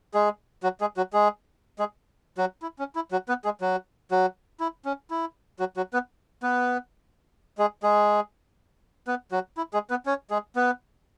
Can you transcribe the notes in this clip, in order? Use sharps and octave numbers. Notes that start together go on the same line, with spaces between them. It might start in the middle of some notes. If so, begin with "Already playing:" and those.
G#3 G#4
F#3 F#4
G#3 G#4
F#3 F#4
G#3 G#4
G#3 G#4
F#3 F#4
E4
C#4
E4
F#3 F#4
B3 B4
G#3 G#4
F#3 F#4
F#3 F#4
E4
C#4
E4
F#3 F#4
F#3 F#4
B3 B4
B3 B4
G#3 G#4
G#3 G#4
B3 B4
F#3 F#4
E4
G#3 G#4
B3 B4
C#4 C#5
G#3 G#4
B3 B4